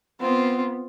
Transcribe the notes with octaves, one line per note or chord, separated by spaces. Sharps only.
B3 C4 F4